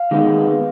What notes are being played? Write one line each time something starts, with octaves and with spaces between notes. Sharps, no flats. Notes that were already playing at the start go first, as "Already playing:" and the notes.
Already playing: F5
D#3 G#3 B3 D#4